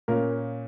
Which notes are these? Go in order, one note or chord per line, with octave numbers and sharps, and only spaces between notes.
A#2 A#3 C#4 A#4